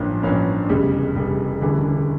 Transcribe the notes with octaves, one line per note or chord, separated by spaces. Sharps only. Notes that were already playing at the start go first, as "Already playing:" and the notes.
Already playing: A1 G2 F3 A#3 C#4
A1 G2 F3 A#3 C#4
F1 E2 C#3 G3
F1 E2 C#3 G3
E1 D2 C#3 E3 G3